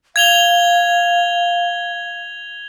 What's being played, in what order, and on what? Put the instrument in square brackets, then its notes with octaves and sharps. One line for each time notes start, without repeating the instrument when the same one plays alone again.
[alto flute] F5 [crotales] G#6 F7 G7